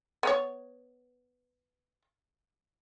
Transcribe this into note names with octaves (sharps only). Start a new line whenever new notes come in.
B3 C#5